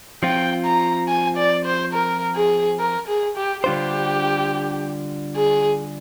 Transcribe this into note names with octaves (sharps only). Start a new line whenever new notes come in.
F3 C4 F4 G5
A#5
G#5
D5
C5
A#4
G#4
A#4
G#4
G4
D3 G3 D4 F4 G4 C5
G#4